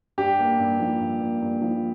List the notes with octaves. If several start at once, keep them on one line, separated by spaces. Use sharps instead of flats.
G2 G4
A#3
G2
F3
G2
A#3
G2
F3